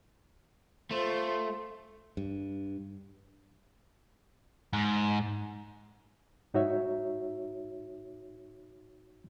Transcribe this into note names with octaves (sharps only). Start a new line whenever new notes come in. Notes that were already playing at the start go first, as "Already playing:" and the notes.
A3 F4 C5
G2
G#2
G#2 D#4 F#4 C#5 E5